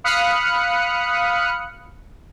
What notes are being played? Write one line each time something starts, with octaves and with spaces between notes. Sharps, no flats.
F5 B5 D#6 F6 F#6 C#7